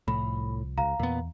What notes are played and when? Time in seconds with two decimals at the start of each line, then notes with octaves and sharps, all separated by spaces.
0.08 C2 A2 F3 B5
0.78 C#2 F5 A#5
0.99 E2 A#2 B3